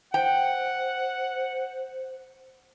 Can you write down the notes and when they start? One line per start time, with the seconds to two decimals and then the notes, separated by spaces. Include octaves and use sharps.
0.14 C5 F#5 G5